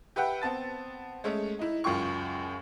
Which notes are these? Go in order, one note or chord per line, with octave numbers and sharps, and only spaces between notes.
G4 B4 E5 F#5 G5
B3 C4 A5 A6
G#3 A3 C#4
D#4 E4
C#2 F#2 F4 G5 C#6